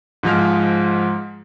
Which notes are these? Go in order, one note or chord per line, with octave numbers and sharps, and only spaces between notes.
G#2 F3 G#3 F6